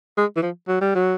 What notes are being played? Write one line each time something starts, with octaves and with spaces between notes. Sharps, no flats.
G#3
E3
F3
F#3
G3
F#3